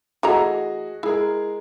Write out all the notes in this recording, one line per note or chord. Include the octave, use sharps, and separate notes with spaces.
E3 A3 F#4 G#4 D#5 A#5
G#3 E4 G#4 A#4